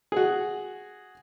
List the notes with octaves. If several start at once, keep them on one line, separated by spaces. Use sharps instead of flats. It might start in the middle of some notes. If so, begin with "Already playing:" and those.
F#4 G#4